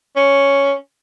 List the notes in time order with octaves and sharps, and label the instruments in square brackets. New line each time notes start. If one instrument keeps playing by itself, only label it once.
[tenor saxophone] C#4